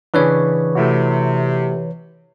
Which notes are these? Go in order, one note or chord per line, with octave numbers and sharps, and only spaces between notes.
C#3 E3 C#4 D4 B4 C#5
C3 A3 E4 F#4